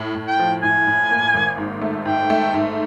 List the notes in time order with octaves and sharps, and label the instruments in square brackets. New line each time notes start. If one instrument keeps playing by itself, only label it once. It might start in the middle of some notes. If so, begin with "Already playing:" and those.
Already playing: [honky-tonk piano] A2
A2
[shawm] G5
[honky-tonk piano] F3
[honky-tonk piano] A2 [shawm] G#5
[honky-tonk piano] A2
A#3
G#1
G#2
A3
[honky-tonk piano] G#2 [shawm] G5
[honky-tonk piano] A3
G#2